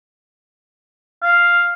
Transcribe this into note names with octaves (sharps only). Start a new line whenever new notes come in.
F5